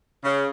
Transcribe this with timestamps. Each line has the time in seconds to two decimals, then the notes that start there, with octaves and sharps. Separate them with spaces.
0.24 C#3